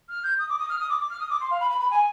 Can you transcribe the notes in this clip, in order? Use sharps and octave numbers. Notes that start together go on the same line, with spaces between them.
F6
G6
D#6
D6
D#6
F6
D#6
D6
D6
F6
D#6
D6
C6
F5
B5
B5
B5
G#5